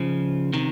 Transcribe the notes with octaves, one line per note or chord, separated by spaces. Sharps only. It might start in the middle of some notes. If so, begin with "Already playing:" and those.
Already playing: C#3 F3
C3 D#3